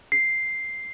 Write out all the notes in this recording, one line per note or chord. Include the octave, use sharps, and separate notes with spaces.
C7